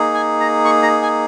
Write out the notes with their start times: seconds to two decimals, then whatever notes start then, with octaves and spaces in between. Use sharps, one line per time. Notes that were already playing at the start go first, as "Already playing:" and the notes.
Already playing: A#3 D#4 G#4
0.14 G#5
0.40 A#5
0.65 C#6
0.83 A#5
1.02 G#5